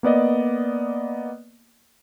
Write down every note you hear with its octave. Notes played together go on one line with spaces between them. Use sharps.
A#3 B3 D5 D#5